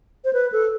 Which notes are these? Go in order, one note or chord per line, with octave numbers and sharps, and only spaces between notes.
C5
B4
A4